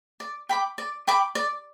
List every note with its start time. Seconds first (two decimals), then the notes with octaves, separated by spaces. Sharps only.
0.20 D5
0.49 G5 B5 D6
0.78 D5
1.07 G5 B5 D6
1.35 D5